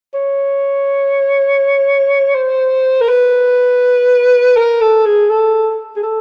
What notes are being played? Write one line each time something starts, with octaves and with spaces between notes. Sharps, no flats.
C#5
C5
A#4
B4
A#4
A4
G#4
A4
G#4
A4